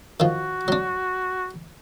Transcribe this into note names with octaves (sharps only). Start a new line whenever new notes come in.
D#3 F3 F#4
F#3 D4